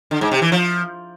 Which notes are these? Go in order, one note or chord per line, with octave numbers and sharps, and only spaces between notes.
D3
G#2
C3
E3
F3